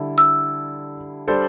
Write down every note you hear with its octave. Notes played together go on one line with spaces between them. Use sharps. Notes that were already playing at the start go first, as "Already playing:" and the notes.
Already playing: D3 G3 E4 A4
E6
G3 D4 A4 C5